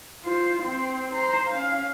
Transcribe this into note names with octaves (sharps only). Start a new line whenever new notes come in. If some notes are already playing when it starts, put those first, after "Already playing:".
F4 C5
C4 C5
C5 A#5
C#4 F5